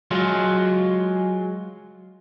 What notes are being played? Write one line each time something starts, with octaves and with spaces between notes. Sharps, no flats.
F#3 G#3 F4